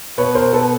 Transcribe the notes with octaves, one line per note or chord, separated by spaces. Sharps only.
B2 B4 C#5
A#4 C5
B2 A4 B4